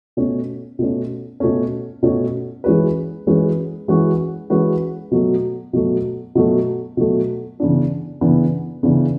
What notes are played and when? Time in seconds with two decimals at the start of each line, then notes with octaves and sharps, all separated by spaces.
0.17 B2 A3 C#4
0.79 B2 A3 C#4
1.40 B2 A3 C#4
2.03 B2 A3 C#4
2.64 E3 G#3 C#4 F#4 B4
3.27 E3 G#3 C#4 F#4 B4
3.88 E3 G#3 C#4 F#4 B4
4.50 E3 G#3 C#4 F#4 B4
5.11 B2 F#3 A3
5.73 B2 F#3 A3
6.35 B2 F#3 A3
6.97 B2 F#3 A3
7.60 C#3 E3 B3 D4
8.21 C#3 E3 B3 D4
8.83 C#3 E3 B3 D4